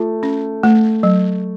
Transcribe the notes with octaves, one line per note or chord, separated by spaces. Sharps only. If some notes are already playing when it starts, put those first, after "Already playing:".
Already playing: A3 F4
C#4
A3
F#3